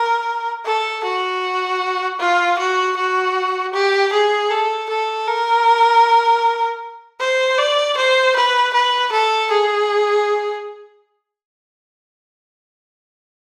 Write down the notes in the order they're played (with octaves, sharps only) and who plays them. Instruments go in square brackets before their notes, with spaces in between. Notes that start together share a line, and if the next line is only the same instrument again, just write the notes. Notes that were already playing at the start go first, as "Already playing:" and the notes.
Already playing: [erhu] A#4
A4
F#4
F4
F#4
F#4
G4
G#4
A4
A4
A#4
C5
D5
C5
B4
B4
A4
G#4